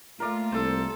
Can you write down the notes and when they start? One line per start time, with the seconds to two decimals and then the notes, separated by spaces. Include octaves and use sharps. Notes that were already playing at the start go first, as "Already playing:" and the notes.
0.20 A3 A#3 F4 A#4 D5
0.52 C2 A4 C5